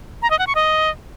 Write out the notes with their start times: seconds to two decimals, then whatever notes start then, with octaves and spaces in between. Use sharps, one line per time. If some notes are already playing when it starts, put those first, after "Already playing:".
0.22 A#5
0.31 D#5
0.39 F#5
0.47 C#6
0.55 D#5